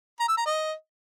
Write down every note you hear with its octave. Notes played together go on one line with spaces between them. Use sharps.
A#5
E6
A#5
D#5